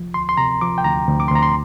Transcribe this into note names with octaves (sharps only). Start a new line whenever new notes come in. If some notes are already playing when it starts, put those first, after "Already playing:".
Already playing: C2 F3
D2 C6
C6
C3 A#5
F3 D6
G5
D2 A#5
D2
D6
C6
D2 A#5
C6